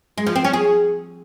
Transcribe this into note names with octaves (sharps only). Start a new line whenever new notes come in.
G#3
F3
C4
C#4
G#4